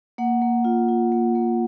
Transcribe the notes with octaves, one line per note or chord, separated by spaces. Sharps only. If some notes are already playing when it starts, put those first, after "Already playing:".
A#3 F#5
A#3
F4
F4
A#3
A#3